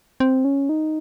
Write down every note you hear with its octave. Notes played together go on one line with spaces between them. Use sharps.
C4
C#4
D#4